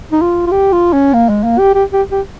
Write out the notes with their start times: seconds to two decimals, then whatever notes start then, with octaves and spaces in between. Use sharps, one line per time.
0.12 D#4
0.21 F4
0.47 F4
0.51 G4
0.72 F4
0.93 C#4
1.13 A#3
1.29 G#3
1.44 A#3
1.58 G4
1.74 G4
1.93 G4
2.11 G4